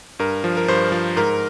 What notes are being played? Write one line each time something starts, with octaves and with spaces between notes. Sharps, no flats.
G2 A#4
F3
A#4
G2 C5
F3
G#2 A#4